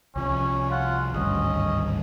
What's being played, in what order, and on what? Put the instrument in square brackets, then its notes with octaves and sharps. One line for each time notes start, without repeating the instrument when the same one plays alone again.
[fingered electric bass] C2 F3 [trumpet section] C#4
[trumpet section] F4 F#5
[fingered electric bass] G#1 D2 G2 [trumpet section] C#4 D#5